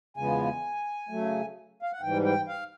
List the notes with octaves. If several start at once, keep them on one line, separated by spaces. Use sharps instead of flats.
E2 C#3 F3 G#3 B3 G#5
C#3 F#3 A3
F5
F#5
G#2 E3 G3 G5
G5
F5